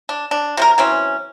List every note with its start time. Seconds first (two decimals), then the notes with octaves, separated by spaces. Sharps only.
0.09 D4
0.31 D4
0.57 C3 F#3 A#4
0.78 E3 F#3 C4 C#4